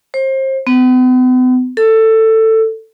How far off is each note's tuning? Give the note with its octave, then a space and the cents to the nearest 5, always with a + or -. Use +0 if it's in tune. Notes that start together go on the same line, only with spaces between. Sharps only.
C5 +30
B3 +40
A4 +15